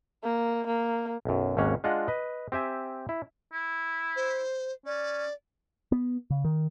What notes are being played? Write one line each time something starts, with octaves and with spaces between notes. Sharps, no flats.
A#3
A#3
B1 F#2
G#1 D#2 A#3 C#4 C#5 F#5
G#3 D4 F4 D#5 F#5
B4 D#5
C4 G4 E5 G#5
E4
E4
C5
C#4 D5
B3
C#3
D#3